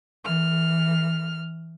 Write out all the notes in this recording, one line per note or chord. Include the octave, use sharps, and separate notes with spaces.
E3 F6